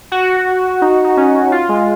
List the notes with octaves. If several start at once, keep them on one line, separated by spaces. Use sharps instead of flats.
F#4
D#4
D#4
C#4
F4
G#3